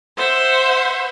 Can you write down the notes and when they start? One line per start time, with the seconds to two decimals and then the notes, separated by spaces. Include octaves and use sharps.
0.16 C5 E5 F#5